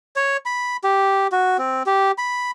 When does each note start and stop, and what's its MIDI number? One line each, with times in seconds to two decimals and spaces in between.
0.16 0.37 73
0.46 0.77 83
0.84 1.27 67
1.32 1.57 66
1.58 1.83 60
1.86 2.11 67
2.18 2.51 83